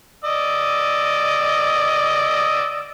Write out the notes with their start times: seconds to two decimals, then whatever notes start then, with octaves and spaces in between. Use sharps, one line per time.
0.24 D5 D#5 E6